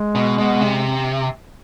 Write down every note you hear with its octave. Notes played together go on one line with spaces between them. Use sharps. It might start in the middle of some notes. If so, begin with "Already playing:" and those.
Already playing: G#3
B2
B2
C3